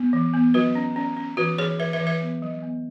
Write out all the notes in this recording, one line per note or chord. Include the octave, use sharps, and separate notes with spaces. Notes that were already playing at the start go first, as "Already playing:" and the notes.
Already playing: B3
E3
B3
F#3 F#4 B4
C#4
C#4
C#4
E3 F#4 B4
E3 G#4 C#5
E3 B4 E5
B4 E5
E3
B4 E5
B3
F#3
B3